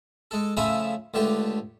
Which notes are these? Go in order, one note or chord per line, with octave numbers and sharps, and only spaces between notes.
G#3 A4
C#3 F3 A3 E5 G#5 B5
C#2 D3 A3 G4